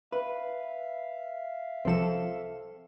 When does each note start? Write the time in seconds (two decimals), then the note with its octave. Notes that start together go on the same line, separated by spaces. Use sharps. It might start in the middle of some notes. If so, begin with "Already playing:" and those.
0.12 B4 E5 F5
1.85 C2 F3 C4 A4 E7